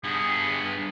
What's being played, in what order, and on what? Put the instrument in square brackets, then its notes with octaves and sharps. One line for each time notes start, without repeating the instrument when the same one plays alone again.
[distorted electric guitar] G2 B3 [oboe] G#4